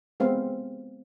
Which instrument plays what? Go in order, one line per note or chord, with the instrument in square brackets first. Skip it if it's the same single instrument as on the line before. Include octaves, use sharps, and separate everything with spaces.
[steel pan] G#3 B3 C4 F5